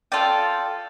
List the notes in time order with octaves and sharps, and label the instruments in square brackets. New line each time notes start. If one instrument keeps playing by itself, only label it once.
[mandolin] F4 A4 D5 G5